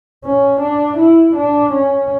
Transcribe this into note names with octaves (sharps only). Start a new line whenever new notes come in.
C#4
D4
E4
D4
C#4